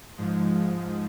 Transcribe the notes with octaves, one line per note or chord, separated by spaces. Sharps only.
G#2 F3 G#3